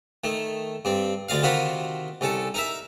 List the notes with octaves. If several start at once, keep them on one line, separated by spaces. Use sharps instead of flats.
D#3 A3
G2 C4
D2 D5 D#5 F5
C3 D#3 F4 F#4 B5 D#6
C2 C#4 A4
D#4 A#4 E5